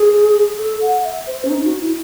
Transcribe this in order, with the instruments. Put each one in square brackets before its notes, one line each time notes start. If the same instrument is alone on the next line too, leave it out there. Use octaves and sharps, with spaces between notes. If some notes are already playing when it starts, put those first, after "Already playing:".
Already playing: [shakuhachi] G#4
A4
F#5
E5
C5
C#4
D#4
F#4
E4